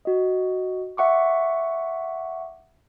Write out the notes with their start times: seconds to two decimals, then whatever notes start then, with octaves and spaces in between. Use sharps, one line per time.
0.05 F#4 D#5
0.97 E5 F#5 C#6 D6